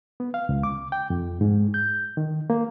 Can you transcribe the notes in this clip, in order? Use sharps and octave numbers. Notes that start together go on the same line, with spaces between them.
B3
F5
C#2
D6
G5
F2
G#2
G6
D#3
A#3